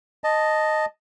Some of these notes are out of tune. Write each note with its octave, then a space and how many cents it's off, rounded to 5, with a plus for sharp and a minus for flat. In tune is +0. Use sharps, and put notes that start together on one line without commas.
D#5 -5 A5 +0